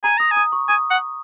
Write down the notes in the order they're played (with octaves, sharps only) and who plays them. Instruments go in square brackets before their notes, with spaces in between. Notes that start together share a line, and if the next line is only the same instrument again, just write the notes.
[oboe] G#5 [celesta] A#5
[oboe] A#5 [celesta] D#6
[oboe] G#5
[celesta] D#6
C#6
[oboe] G#5 [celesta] D#6
[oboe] F#5